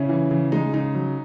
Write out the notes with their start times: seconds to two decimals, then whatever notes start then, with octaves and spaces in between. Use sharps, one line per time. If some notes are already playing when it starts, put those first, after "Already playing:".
Already playing: C#3 C#4 E4
0.09 E3
0.31 C#3
0.52 G#3 D#4
0.73 C#3 D#4
0.95 F#3